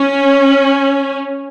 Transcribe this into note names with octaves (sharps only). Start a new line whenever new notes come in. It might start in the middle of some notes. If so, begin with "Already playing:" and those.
Already playing: C#4